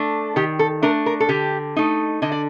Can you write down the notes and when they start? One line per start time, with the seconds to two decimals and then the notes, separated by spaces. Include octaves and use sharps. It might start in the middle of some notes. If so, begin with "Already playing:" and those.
Already playing: A3 D4
0.36 D#3 G4
0.59 A4
0.82 A3 D4 A#4
1.06 A#4
1.20 A4
1.29 D3 G4
1.76 A3 D#4
2.22 D3 D#5
2.32 D5